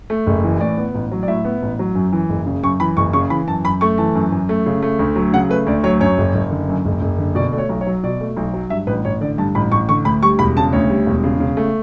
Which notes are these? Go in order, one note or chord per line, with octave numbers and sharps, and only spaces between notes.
A3
F#1
E3
A2 D5
B3
A1
F#3
D5
A2 E5
B3
A1
F#3
F#2
E3
F#1
C#3
F#2 C#6
E3 B5
F#1 C#6
C#3 C#6
E3 B5
F#2 A5
F#2 B5
A3 C#6
E3 A5
F#2
F#2
A3
C#3
A3
D2
F#3
C#3 F#5
A3 B4
D2 D5
F#3 C#5
F#2 C#5
F#1
F#1
D3
F#2
F#1
F#1
D3
B2 D5
A3 D5
C#5
B1
C#5
F#3
B2 D5
A3
B1
F#3
G2 E5
A1 B4
A1 C#5
D3 D5
G2 A5
A1 B5
A1 C#6
D3 C#6
D2 B5
G3 C#6
E1 B5
C#3 A5
D2 C#5
G3
E1
C#3
C#3
A3